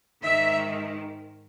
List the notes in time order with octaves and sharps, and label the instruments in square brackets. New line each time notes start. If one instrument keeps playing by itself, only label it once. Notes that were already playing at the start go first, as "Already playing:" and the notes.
[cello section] G#2 D#3 E5